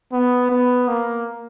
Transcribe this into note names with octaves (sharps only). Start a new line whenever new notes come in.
B3
B3
A#3